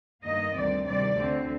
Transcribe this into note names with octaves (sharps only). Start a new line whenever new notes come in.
G2 D#3 A#3 D#5
D2 C3 D#3 G3 C4 D5
C3 D#3 G3 D5
D2 D3 A3 C4